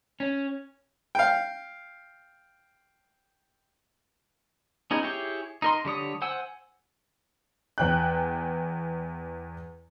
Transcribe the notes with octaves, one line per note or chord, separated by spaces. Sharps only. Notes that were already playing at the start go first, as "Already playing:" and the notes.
C#4
F5 G5
B3 C#4 D#4 G#4
E4 G4 G#4 C#5 G5
D#4 A#4 C6
D3 G3 C#5 D#6
C5 F#5 G#5 E6
E2 G5 F#6